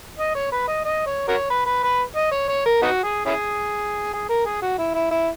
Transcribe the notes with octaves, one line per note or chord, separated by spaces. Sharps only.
D#5
C#5
B4
D#5
D#5
C#5
F#4 A#4 C#5
B4
B4
B4
D#5
C#5
C#5
A#4
B3 D#4 F#4
G#4
C#4 E4 G#4
G#4
A#4
G#4
F#4
E4
E4
E4